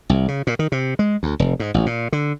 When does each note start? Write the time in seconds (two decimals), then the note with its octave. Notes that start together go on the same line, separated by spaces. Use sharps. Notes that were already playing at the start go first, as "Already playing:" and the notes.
0.09 C2
0.28 C#3
0.47 A#2
0.59 D#3
0.72 C3
0.99 G#3
1.23 D2
1.39 F1
1.60 G#2
1.74 A1
1.86 A#2
2.12 D3